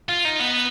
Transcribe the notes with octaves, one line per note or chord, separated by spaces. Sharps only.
F4
D#4
B3